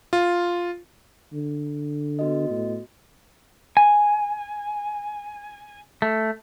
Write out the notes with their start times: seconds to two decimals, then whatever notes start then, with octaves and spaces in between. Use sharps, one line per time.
0.13 F4
1.33 D3
2.19 B3 F#4 D#5
2.50 A2
3.77 G#5
6.02 A3